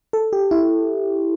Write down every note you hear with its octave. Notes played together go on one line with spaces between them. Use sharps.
A4
G4
E4